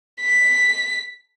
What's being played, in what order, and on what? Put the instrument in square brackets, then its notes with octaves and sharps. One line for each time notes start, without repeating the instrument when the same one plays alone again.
[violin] B6